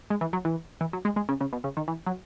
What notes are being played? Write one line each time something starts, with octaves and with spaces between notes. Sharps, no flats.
G#3
E3
F#3
E3
E3
F#3
G#3
G#3
C#3
C#3
B2
C#3
D#3
E3
F#3